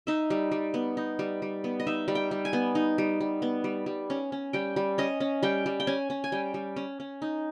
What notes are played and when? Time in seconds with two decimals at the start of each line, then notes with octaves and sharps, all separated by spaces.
0.07 D#4 E5
0.30 G3
0.52 G3
0.74 B3
0.97 D#4
1.19 G3
1.42 G3
1.64 B3
1.80 D#5
1.87 D#4 E5
2.08 G3
2.15 G5
2.31 G3
2.45 G#5
2.53 B3
2.75 D#4
2.98 G3
3.21 G3
3.42 B3
3.64 G3
3.86 G3
4.10 C#4
4.32 C#4
4.53 G3 G5
4.76 G3
4.98 C#4 D#5
5.20 C#4
5.43 G3 G5
5.66 G3
5.80 G5
5.87 C#4 G#5
6.10 C#4
6.24 G#5
6.32 G3 G5
6.54 G3
6.76 C#4
7.00 C#4
7.22 D#4